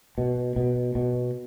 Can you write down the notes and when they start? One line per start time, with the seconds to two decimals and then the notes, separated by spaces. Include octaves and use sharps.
0.18 B2
0.56 B2
0.95 B2